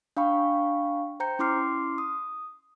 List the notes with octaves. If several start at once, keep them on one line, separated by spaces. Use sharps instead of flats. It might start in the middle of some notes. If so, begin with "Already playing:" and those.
D4 F5 G5 B5 C#6
C5 G5 A#5 G6 C#7
C#4 E4 C6 D6 F6 C7
D#6